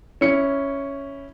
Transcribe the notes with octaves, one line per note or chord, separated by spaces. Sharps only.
C#4 E4 C#7